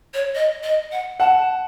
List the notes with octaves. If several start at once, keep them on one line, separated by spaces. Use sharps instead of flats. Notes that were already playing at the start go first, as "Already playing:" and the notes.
C#5
D#5
D#5
F#5
F#5 A5